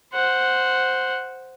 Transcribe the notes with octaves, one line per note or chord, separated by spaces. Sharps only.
C5 F#5